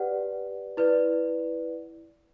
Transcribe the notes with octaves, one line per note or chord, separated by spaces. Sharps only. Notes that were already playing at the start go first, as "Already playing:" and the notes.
Already playing: G4 B4 D5 F#5
E4 B4 D5